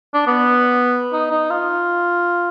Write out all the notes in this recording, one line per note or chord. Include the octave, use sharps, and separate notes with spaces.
D4
B3
D#4
D#4
F4